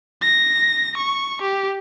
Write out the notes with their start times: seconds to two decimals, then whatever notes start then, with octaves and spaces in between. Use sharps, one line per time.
0.22 A#6
0.97 C#6
1.42 G4